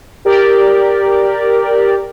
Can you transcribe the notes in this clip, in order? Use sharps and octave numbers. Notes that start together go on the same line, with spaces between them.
G4 A#4 D5